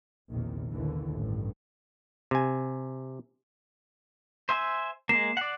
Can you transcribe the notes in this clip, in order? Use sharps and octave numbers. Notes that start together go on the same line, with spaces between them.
A#1 E2 C3 D#3
A1 D#2 A2 D3 E3
A1 G2
C3 G#5
C5 E5 G#5
G#3 A#3 C7 E7
D5 F#5